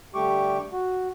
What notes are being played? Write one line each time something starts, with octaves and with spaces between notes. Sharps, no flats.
D3 G3 A3 G4 C#6 D6
F#4